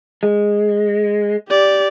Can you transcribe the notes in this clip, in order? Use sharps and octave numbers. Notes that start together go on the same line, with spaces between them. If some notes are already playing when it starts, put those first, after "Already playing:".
G#3
G4 D5